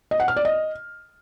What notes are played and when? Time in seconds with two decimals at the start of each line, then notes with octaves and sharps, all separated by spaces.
0.11 D#5
0.20 F#5
0.28 F6
0.36 D5
0.45 D#5